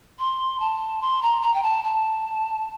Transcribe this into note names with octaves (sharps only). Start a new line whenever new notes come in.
C6
A5
C6
A#5
A#5
G5
A5
A5